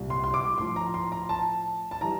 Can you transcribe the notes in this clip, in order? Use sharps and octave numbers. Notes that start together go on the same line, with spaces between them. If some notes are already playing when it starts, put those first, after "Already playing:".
Already playing: C2 A#2 G3
C6
C6
D6
A2 F3 C6
A#5
C6
A#5
A5
A5
E3 G3 A#5